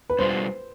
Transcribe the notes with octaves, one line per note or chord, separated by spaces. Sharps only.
B4
B2 G3 D4 F4 C5